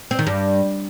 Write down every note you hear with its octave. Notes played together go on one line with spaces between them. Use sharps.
C4
D#3
G2